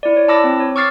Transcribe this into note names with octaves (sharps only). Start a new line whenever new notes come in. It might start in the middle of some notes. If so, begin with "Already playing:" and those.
E4 D5
C#5
E4 A5 B5 D6 E6 A#6
C4
C#5
C#6 D6 E6 F6 A6 C7